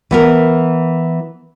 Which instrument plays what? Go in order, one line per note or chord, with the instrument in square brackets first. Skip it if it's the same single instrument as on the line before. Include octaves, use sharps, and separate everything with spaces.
[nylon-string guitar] E3 B3 A#4